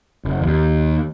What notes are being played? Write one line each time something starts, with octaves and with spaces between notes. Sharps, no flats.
F#1
D#2